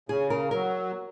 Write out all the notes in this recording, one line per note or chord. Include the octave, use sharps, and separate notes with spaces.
C#3 G#4
A#4
F#3 A#4